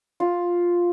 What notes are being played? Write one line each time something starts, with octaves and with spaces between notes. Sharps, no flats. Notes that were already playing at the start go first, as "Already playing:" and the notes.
F4